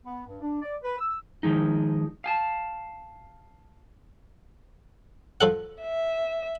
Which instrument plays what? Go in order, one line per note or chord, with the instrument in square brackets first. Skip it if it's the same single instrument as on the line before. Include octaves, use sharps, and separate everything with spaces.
[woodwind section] B3
G2
D4
D5
B4
E6
[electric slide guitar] D#3 F3 G#3 D#4
F5 G#5 A5
[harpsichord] F3 A4 F#5
[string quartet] E5